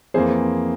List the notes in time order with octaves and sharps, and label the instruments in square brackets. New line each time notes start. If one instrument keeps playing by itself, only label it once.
[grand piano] F2 E3 A#3 G#4 C5